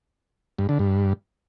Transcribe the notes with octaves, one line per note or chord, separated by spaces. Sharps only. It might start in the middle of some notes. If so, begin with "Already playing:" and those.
G2
D3
G2